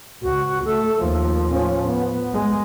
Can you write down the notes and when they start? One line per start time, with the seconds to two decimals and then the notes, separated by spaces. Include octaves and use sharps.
0.23 C#2 F#4
0.65 A3 A4
0.99 D#2 F3
1.47 A2 C#4
1.88 B3
2.33 G#3